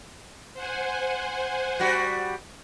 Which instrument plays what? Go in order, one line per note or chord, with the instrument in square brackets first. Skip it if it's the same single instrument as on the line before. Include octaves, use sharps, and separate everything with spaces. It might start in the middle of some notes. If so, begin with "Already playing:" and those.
[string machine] C5 F#5 G#5
[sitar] G3 F#4